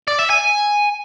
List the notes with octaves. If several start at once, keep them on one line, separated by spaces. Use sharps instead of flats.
D5
E5
G#5